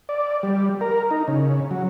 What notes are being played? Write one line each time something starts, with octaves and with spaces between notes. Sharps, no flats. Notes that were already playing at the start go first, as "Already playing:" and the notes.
D5
G3
A#4
D#4
C#3
F#3